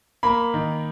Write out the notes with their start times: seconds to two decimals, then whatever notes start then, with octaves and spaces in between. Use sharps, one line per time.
0.23 A#3 B5
0.54 D#3